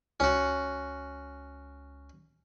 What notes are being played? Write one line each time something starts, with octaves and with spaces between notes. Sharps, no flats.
C#2 C#4 F#4